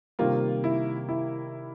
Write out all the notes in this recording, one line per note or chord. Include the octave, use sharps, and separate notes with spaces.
C3 D#3 G3 A#3 F4
E4
E4